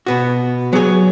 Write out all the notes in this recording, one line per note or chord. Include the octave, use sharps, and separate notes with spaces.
B2 B3 F#4
F#3 B3 G#4 C#5